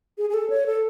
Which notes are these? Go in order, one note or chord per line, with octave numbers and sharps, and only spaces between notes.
G#4
G#4
A4
C#5
A4